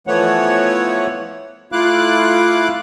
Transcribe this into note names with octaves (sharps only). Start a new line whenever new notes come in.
E3 F3 A3 B3 C#5 F#5
A3 E4 F4 F5 D6 F#6